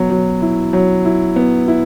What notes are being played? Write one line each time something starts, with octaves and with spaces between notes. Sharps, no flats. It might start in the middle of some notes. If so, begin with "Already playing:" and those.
Already playing: B2 F#3
F#3
E4
F#3
E4
B3
E4